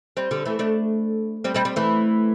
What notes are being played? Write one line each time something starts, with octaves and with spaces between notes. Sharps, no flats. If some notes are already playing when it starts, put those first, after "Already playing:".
G3 C4
D3 G3
E3 A3
A3 D4
G3 C4
G3 C4
G3 C4
E3 A3